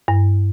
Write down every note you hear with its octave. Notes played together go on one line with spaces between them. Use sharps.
G2